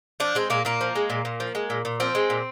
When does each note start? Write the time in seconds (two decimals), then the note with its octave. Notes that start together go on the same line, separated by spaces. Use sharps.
0.20 F3 D4
0.35 G#3 C4
0.50 A#2 A#3
0.65 A#2 A#3
0.81 F3
0.96 G#3
1.10 A#2
1.25 A#2
1.40 F3
1.55 G#3
1.70 A#2
1.85 A#2
2.00 F3 C4
2.15 G#3
2.30 A#2